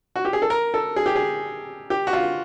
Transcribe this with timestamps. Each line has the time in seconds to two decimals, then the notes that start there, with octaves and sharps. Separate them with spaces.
0.16 F#4
0.25 G4
0.33 G#4
0.42 A4
0.50 A#4
0.74 A4
0.96 G#4
1.06 G4
1.16 G#4
1.90 G4
2.07 F#4
2.13 F4